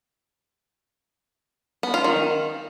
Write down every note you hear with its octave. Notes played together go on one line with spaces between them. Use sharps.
B3
F4
D#3